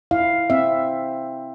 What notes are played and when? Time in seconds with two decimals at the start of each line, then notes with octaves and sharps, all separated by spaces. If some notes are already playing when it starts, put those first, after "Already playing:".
0.11 E4 F5
0.50 C4 E5